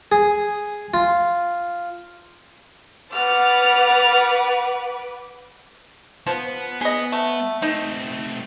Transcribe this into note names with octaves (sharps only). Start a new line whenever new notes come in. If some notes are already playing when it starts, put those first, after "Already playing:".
G#4
F4
B4 F#5 D6 F6 A6
F3 B3
B3 G#4 D#5
A3
A3 C4 D#4